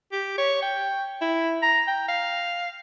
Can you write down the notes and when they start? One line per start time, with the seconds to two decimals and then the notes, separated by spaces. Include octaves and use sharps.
0.12 G4
0.38 C#5
0.62 G5
1.22 E4
1.62 A#5
1.87 G5
2.08 F5